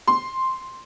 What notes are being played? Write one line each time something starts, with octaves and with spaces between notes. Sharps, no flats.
C6